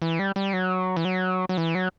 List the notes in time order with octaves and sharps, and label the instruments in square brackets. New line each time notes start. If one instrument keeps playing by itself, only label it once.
[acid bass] E3
G3
G3
F#3
E3
F#3
F#3
E3
F#3